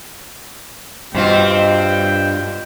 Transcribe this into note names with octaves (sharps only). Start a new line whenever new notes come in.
G2 B2 C4 F4 G5